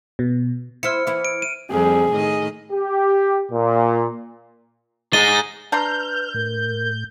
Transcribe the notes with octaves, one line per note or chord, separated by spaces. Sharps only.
B2
E4 C5 F6 C#7
E3 E4
D7
D#7
F2 G3 C4 G#4
A2 D#3 D#5
G4
A#2
G#3 D#4 A6 D#7 G7
D4 B4 A#5 C6 F6 G6
A2 A#4